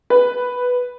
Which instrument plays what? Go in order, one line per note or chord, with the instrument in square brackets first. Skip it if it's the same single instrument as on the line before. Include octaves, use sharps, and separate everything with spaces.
[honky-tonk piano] B4